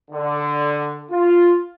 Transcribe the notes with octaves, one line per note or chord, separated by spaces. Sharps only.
D3
F4